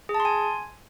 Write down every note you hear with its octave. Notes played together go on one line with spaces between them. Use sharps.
G#4
A5
C6
G#5